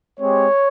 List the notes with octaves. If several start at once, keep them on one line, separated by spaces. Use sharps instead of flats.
G#3 C4 G4 C#5